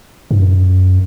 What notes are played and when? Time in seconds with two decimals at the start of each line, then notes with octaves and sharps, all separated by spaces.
0.31 G2
0.41 F#2